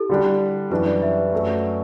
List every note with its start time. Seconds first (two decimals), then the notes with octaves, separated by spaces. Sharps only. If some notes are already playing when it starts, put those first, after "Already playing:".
Already playing: E4 G4 A4
0.10 D3 G3 D4
0.70 F#2 E3 G3 D4 B4
0.86 D5
1.02 E5
1.18 B4
1.32 F#2 F#3 A3